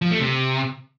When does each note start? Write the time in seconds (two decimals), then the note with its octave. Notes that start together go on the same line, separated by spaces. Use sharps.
0.02 F3
0.11 A3
0.20 C3